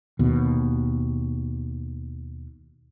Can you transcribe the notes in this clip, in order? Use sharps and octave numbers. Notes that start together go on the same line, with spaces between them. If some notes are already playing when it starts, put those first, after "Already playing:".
D#2 B2